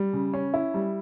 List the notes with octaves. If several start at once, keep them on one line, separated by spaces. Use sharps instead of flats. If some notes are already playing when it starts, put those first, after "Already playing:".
Already playing: G3
C#3
C#4
E4
G3